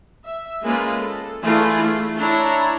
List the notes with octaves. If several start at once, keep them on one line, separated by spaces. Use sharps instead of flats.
E5
G#3 A#3 C#4 F4 B4
A4
E3 A3 D4 E4 F4 G#4
A3
D4 E4 C#5 A#5